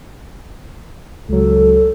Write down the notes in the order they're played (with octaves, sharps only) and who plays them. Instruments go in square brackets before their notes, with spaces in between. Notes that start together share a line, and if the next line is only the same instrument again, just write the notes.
[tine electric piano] C#2 F#3 [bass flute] A4